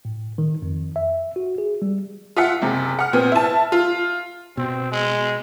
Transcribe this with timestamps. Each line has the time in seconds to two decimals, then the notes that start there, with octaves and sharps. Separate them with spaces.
0.05 A2
0.38 D#3
0.62 F2
0.96 E5
1.36 F#4
1.58 G#4
1.82 G3
2.37 F4 E5 F#5
2.62 F#1 C3
2.99 F#5 F6
3.13 A#2 B3 C4
3.32 E4 A5
3.72 F4
4.57 B2 C4
4.92 G#3